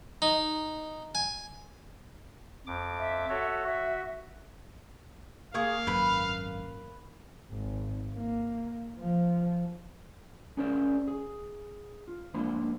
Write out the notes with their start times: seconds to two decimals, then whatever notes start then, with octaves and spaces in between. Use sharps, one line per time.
0.22 D#4
1.15 G#5
2.67 F2 D6
2.99 E5
3.30 F#4 A4 C#5
3.64 F#4 E5
5.54 A#3 G#4 F5 C#6 D#6
5.87 G#1 F#2 B4 B5
7.51 G#1
8.16 A#3
9.00 F3
10.57 C#4 G#4 A#4 C5 D5
11.08 G#4
12.08 F4
12.34 G#2 F3 A#3 D4 C5 B5